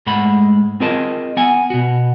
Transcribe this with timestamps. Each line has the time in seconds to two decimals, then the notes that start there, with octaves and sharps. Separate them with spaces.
0.07 G#2 G#3 A3 F#5 B5
0.80 C4 F4 G#4 A#4 D#5 A5
1.37 B3 F#5 G#5
1.70 B2 F#4